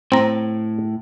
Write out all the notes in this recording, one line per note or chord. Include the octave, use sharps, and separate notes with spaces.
A2 C4 A#5